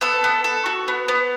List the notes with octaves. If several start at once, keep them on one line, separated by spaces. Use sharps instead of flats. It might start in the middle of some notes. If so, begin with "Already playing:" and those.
B3 A4
B3
A4
F#4
B3
B3